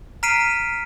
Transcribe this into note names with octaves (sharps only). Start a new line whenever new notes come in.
A#5 F6 B6 C7 D7 D#7